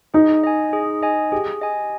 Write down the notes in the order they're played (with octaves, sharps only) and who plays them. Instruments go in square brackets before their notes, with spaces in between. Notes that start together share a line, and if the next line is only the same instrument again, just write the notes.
[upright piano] D#4 [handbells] G#4
[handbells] D#5 G#5
G#4
D#5 G#5
[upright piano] G4 [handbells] G#4
[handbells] D#5 G#5